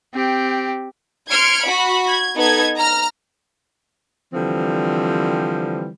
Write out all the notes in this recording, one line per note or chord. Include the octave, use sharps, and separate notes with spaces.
C4 G4
C6 F6 G#6 C#7 D7
F#4 B5
G#6
B3 D#4 A4 G#6
A#5 F6
D3 E3 F3 G3 C4